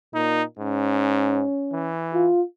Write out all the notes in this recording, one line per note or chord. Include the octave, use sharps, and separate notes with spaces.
A#2 D#4
G#2 C#4
E3
F4